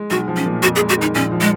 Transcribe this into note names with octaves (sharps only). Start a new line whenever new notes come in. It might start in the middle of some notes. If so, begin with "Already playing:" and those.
Already playing: G#3
B1 F#4
F3
C#4
A#2
F2 F#4
G#4
G#3
F#4
D#3 D#4
A#1 C#4
F3
G#3